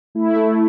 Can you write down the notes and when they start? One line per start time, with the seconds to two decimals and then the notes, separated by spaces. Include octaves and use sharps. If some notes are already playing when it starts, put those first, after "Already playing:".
0.15 A3 E4
0.36 A3